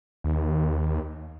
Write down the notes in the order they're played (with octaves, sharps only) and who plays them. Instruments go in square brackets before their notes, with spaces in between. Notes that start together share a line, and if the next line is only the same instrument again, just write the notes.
[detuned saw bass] D#2